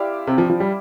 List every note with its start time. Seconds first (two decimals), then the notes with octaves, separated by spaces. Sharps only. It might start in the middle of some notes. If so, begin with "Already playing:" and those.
Already playing: C4 E4 G4 D5 F5
0.27 C3
0.38 F3
0.50 F3
0.60 G3